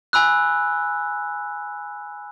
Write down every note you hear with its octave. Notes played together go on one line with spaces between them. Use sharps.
G#5 B5 E6 F#6